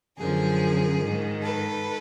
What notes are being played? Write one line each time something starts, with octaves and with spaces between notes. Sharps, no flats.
F#2 D3 F3 G#4 A#4
G#2 D#3
A4 B4